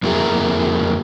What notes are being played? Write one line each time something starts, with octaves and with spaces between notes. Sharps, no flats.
F2 A#3 E4 F4 G#4 A#5